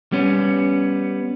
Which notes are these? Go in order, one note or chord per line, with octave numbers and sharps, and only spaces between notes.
G3 B3 C#4